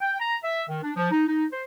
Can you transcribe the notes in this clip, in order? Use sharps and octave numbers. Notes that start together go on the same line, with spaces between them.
G5
A#5
E5
D#3
D4
F3
D#4
D#4
C5